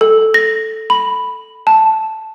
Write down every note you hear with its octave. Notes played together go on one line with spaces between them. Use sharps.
A4
A#6
B5
A5